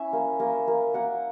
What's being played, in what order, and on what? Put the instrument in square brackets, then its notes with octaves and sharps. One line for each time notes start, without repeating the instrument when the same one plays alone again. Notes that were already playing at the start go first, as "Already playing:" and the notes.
Already playing: [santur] C#4 E4 E5
A#3
A#3
A#3
A#3 F#5